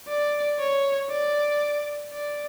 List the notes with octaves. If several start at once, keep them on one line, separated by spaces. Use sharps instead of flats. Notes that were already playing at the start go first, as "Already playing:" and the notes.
D5
C#5
D5
D5